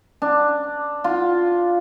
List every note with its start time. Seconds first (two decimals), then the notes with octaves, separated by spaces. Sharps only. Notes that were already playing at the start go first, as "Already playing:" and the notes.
0.22 D4
1.04 F4